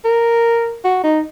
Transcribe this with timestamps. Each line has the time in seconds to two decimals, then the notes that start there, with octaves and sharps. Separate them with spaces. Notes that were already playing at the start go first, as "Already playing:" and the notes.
0.05 A#4
0.84 F#4
1.03 D#4